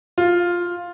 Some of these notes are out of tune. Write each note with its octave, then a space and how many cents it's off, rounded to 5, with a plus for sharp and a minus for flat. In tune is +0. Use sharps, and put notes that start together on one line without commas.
F4 +5